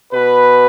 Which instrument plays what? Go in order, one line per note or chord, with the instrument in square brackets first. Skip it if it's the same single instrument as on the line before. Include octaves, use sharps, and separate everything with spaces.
[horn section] B2 B4